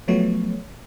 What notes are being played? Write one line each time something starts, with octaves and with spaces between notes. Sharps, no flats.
F3 F#3 A3 B3 C#5